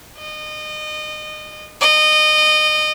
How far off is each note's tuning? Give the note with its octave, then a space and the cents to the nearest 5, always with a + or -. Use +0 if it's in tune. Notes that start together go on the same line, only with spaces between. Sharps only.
D#5 -30
D#5 -25